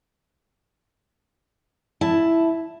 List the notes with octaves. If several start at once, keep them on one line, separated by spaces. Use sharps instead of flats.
E4 A5